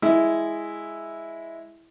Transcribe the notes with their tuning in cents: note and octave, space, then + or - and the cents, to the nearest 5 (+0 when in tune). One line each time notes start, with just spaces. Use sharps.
G#3 +0 E4 +0